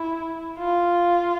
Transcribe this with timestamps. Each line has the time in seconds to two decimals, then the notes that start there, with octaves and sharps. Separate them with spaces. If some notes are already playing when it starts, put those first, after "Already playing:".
Already playing: E4
0.58 F4